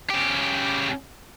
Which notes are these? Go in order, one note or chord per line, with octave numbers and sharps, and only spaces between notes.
C#3 G4